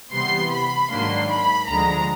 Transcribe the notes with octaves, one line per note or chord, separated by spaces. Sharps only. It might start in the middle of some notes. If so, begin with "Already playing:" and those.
C3 E3 G3 B3 C6
B5
G#2 D#3 F#3 A#3 D4 C6
B5
D2 D3 F3 G#3 A#5